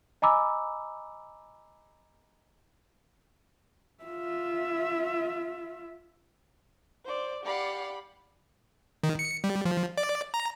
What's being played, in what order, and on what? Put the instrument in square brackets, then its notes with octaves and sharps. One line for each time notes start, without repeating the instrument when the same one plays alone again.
[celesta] D#5 G#5 A#5 B5 D6 E6
[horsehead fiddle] F4 E5
[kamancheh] C5 D5
[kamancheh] G4 B5 [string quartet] D5 F5 F#5
[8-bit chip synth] D#3
C#7
G3
F3
D5
A#5